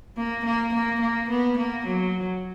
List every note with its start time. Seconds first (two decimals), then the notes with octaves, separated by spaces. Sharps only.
0.17 A#3
0.45 A#3
0.74 A#3
1.01 A#3
1.30 B3
1.58 A#3
1.86 F#3